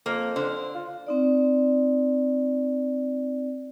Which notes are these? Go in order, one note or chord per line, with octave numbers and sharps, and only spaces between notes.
F2 A#3
D3 C5
F4
C4 D#4 D5